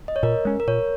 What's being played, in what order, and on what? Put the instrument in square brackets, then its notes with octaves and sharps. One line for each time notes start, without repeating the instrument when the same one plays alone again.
[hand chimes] D#5
C#5
[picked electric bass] A#2 [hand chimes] A#4
[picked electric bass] G#3 C#4
[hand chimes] A#4
[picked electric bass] A#2 [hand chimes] C#5